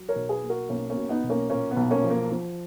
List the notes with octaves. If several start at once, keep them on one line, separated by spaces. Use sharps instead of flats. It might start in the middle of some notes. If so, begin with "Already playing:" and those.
Already playing: F#3
A#4 C#5
B1
G#4 B4
A#3
F#4 A#4
B1 A#3 C#4
A#3 C#4
B2
B3 D#4
B1
A#3 C#4
A#2 A#3 C#4
B3
B1
A#3 C#4
F3
A#3
F3